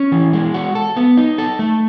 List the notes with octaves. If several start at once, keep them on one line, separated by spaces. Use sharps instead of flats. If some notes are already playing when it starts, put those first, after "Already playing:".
Already playing: C#4
E3
G#3
F#4
A4
B3
D#4
A4
A3